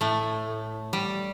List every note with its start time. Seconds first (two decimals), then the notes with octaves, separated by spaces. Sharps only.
0.01 A2 A3
0.93 G3